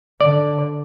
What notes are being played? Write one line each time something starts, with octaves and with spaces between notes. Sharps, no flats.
D3 D5